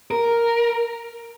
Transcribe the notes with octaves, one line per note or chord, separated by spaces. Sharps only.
A#4